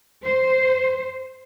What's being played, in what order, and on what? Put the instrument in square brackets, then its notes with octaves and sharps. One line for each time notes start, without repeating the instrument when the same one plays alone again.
[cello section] C5